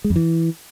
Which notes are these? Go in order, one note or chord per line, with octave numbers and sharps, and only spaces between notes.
G#3
F2
E3